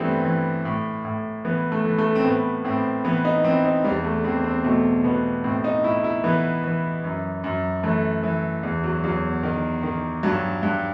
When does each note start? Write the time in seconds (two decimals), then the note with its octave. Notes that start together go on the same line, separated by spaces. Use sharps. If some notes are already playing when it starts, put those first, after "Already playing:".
Already playing: G2 E3 G3 A3 B3 C4
0.25 E3
0.65 A2
1.05 A2
1.45 E3 B3
1.72 A3
1.85 E3
1.98 A3
2.15 C4
2.24 A2 B3
2.65 A2 C4
3.05 E3 B3
3.25 D#4
3.44 E3 C4
3.65 D#4
3.84 E2 G3
4.04 A3
4.24 E2 C4
4.44 C4
4.64 B2 A3
5.04 B2 B3
5.44 A2 C4
5.64 D#4
5.84 A2 E4
6.04 E4
6.24 E3 B3
6.64 E3
7.04 F#2
7.44 F#2
7.83 E3 A3
8.23 E3
8.63 E2
8.84 F#3
9.04 E2 F#3
9.43 D#3
9.83 D#3
10.23 G2 F#3
10.63 G2